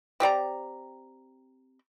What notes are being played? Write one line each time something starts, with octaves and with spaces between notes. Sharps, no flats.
C4 G4 D5 A#5